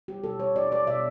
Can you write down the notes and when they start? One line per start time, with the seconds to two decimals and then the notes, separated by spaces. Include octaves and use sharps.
0.08 G4
0.24 B2 A4
0.39 C#5
0.56 B2 D5
0.72 D5
0.87 B2 E5